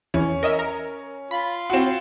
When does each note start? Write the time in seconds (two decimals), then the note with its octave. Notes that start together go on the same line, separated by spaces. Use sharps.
0.14 E2 E3 C#4
0.43 A#4 D#5 E5
0.59 A#4
1.31 F4 B5
1.70 C4 F#4